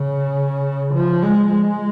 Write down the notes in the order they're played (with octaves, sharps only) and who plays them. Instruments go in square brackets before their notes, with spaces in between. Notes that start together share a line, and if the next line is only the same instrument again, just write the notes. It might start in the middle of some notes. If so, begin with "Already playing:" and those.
Already playing: [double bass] C#3
F3
G#3
G#3